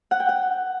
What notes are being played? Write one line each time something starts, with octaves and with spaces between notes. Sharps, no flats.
F#5
G5
F#5